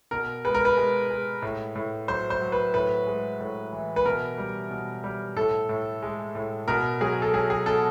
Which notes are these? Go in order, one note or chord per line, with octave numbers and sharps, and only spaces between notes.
B2 A#4
G#3 B4
A#4
B4
G#3
G#3
A2
A2
F#3 C5
C5
F#3
B4
A2 B4
G#3
A2
E3
B4
B2 A#4
G3
B2
G3
A2 A4
A2
G#3
A2
B2 A#4
F#3 G#4
A4
F#3 G#4
G#4
B2 A4